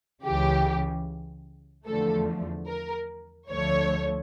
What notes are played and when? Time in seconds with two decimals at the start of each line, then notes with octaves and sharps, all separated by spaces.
0.24 C#2 C#3 E3 G4
1.87 E2 D3 F3 A3 A4
2.68 A#4
3.50 D2 D3 F3 A3 C#5